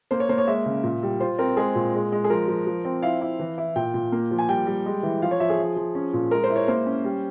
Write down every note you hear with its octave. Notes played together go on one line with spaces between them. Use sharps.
A#3 C5
C#5
A#3 C5
C#5
G#3 E5
C#3
A#2
G3
F4 C5
C4 A#4
G#3 G#4
A#2
G#3
G#3
G#4
F3 A#4
F3
F3
C4
E4 F5
E4
E3
E4
A#2 G5
A#2
A#3
F3
G#5
G3 G5
G3
G#3
E3
F3 F5
C#5
F3 E5
G#4
F3
F3
C#4
A#2
G#3 A#4
C5
E4
C#5
A#3 C5
C#4
G3